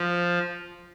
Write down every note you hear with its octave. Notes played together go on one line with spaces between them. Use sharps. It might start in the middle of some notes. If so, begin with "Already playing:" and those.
Already playing: F3